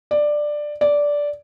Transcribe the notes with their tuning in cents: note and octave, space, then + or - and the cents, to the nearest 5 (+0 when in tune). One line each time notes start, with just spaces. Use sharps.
D5 +10
D5 -10